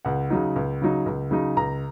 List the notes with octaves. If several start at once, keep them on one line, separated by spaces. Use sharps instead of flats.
C#2 F#5
C#3 F#3 D#4
C#2
C#3 F#3 D#4
C#2
C#3 F#3 D#4
C#2 A#5